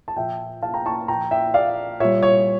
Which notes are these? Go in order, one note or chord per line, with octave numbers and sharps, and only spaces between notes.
A5
A#2 F3 E5 G5
F5 A5
G5 A#5
A5 C#6
A#2 F3 G5 A#5
E5 G5
D5 F5
A#2 G3 C#5 E5
C#5